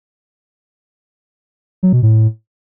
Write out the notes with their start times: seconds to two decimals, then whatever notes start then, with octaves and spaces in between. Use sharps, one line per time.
1.83 F#3
1.93 B2
2.03 A2